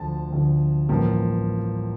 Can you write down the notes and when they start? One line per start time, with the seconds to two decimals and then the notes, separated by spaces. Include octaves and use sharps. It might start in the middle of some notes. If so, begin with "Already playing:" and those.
Already playing: D2 D3 F3 A5
0.30 D2 D3 F3
0.89 A1 G2 F3 A#3